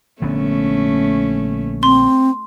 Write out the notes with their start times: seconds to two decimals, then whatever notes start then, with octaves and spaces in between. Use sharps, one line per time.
0.22 A#1 D3 A3 B3 C#4
1.83 C4 C6